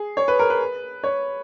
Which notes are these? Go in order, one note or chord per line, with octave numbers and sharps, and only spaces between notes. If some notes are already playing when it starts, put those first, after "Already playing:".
Already playing: G#4
C#5
B4
A#4
B4
C#5